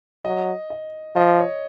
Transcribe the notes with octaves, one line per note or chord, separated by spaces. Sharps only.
F#3 D#5
D#5
F3 D#5
C#5